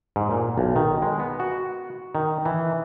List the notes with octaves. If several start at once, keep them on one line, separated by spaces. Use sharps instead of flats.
G#2
A#2
B1
D#3
G#3
B3
F#4
D#3
E3